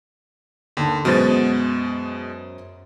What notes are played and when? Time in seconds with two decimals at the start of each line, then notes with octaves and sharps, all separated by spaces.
0.77 D#2 D3
1.05 F#2 B2 G#3 B3 C5 A6